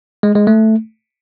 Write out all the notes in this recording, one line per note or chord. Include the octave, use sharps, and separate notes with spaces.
G#3
G#3
A3